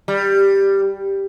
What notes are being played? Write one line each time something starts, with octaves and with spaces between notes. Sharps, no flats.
G3